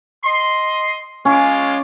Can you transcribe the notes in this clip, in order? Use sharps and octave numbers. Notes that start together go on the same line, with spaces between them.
D#5 C6
G#3 C#4 F4 D6